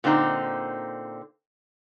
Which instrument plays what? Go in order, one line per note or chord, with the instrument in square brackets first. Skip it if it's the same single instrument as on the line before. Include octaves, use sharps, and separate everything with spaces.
[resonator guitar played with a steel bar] A#2 D3 C4 D#4 A#5